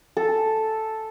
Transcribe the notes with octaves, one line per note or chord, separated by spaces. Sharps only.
A4